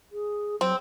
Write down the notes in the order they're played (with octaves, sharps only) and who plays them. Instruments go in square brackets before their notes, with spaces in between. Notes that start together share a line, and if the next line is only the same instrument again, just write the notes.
[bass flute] G#4
[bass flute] F#3 [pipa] C4